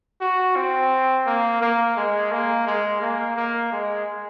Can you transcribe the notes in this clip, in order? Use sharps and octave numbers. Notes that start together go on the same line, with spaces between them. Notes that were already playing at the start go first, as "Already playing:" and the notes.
F#4
C4
A#3
A#3
G#3
A#3
G#3
A#3
A#3
G#3